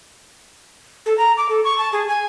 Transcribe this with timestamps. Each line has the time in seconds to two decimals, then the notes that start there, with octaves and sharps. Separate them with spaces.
1.06 A4
1.18 A#5
1.37 D6
1.49 A4
1.64 C#6
1.78 A5
1.93 G#4
2.08 G#5